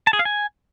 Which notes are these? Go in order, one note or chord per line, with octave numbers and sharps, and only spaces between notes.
A5
G#4
F5
G#5